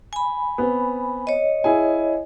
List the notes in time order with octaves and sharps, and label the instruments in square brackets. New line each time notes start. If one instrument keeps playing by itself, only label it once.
[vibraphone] G#5 B5
[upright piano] B3 C4
[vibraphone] C#5 D#5
[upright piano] E4 G#4 G#5